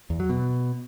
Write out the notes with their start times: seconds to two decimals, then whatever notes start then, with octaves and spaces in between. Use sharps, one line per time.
0.10 E2
0.20 F#3
0.29 B2